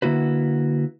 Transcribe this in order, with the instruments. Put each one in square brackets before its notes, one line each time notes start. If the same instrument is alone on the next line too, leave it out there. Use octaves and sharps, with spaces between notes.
[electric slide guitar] D3 A#3 E4 F#4 B4